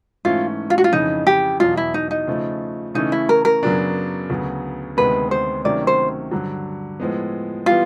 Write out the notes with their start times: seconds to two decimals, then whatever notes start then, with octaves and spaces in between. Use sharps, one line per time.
0.25 G#2 E3 A3 C#4 F4
0.70 F4
0.78 F#4
0.84 F4
0.93 F2 C#3 E3 D#4
1.27 G4
1.60 E2 B2 F#3 F4
1.77 E4
1.94 D#4
2.11 D#4
2.27 C#3 F3 A3
2.95 C#3 E3 A3 C#4 D#4
3.12 E4
3.29 A#4
3.45 A#4
3.63 F#2 C#3 F#3 B3 D4
4.30 D2 C#3 F#3 B3
4.97 D2 C3 D#3 G#3 B3 B4
5.31 C5
5.64 C3 D#3 F#3 A3 C#4 D5
5.87 C5
6.31 G2 D3 F#3
7.00 A2 F3 G#3 B3
7.66 E3 G3 B3 F4